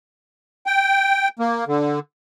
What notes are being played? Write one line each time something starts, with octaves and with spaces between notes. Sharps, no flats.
G5
A#3
D3